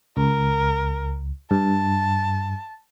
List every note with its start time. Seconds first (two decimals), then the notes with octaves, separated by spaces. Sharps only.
0.17 C#2 A#4
1.51 G2 A5